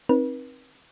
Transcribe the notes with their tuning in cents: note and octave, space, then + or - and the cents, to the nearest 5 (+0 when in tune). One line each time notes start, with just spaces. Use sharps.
C4 +15 D#4 +0 B4 -40